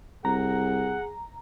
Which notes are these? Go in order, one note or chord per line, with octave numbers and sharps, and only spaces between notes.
C2 G#4 F#5 A#5